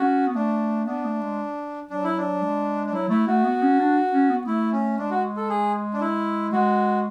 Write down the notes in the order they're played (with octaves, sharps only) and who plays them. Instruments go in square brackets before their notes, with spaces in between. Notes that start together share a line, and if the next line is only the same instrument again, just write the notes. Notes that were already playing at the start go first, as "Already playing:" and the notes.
Already playing: [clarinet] C#4 [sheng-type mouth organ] F#4
[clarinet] B3
[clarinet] A3 [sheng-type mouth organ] D4
[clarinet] B3 [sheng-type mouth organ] D4
[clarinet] A3
G#3
[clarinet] F#3 [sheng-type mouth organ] D4
[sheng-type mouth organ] E4
D4
[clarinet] G#3
[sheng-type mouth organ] D4
[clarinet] F#3 [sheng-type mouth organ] E4
[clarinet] A3 [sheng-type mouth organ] E4
[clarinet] A3 [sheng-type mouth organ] F#4
[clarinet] B3
C#4
D4
C#4
B3
[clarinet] A3 [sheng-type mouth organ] E4
[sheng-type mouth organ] C#4
[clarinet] G#3 [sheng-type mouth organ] D4
[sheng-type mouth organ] F#4
A4
G#4
D4
E4
[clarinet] G#3 [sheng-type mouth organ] F#4